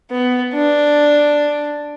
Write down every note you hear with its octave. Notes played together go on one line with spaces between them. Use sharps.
B3
D4